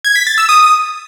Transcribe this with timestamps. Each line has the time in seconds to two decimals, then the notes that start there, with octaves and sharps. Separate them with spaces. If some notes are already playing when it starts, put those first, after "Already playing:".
0.04 G#6
0.16 B6
0.27 A6
0.38 E6
0.49 D#6